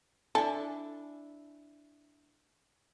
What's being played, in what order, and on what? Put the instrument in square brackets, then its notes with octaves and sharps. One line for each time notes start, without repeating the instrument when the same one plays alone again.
[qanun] D4 E4 E5 [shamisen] A4 [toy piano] D5 G#5 B5